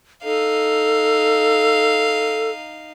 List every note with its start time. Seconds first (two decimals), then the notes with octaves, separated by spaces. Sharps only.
0.24 D#4 A4 F5